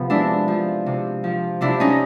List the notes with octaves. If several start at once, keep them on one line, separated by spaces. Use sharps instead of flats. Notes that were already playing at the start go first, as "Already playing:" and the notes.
Already playing: C3 F3 B3
G#3 D4 E4
F3
C3
F3
C3 D4 E4
C#4 D#4